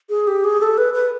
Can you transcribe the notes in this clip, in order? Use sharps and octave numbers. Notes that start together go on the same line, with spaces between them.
G#4
G4
G#4
A4
B4
B4